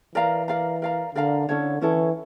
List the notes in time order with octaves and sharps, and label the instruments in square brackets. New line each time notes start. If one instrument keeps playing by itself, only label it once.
[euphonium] E3 [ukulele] A#4 D5 F5 A#5
[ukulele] A#4 D5 F5 A#5
A#4 D5 F5 A#5
[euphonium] D3 [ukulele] A#4 D5 F5 A#5
[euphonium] D3 [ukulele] C#4 E4 A4 C#5
[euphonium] E3 [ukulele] C#4 E4 A4 C#5